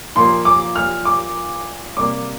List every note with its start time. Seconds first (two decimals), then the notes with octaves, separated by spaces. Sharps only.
0.15 A#2 F3 A#3 C6
0.45 D6
0.76 F6
1.05 D6
1.97 C3 G3 A#3 D6